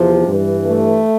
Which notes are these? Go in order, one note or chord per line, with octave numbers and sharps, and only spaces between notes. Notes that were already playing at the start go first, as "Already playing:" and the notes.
Already playing: E2 C3 F3
G2
E3
A3